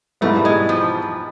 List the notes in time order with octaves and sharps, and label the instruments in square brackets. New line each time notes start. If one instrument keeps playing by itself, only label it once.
[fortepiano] G#2 E3 G3 B3 [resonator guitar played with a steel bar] A3
[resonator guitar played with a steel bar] G#3
F3